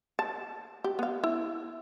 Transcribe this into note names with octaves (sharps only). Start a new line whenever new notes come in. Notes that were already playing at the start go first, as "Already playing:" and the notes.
A5
G4
B3 F5
E4